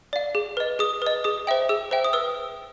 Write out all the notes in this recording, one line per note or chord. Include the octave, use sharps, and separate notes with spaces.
D5 F5
G#4
B4 D#5
G#4 D#6
B4 D#5
G#4 D#6
C5 E5 G5
G#4 E6
C5 E5 G5
D#6
B4 E6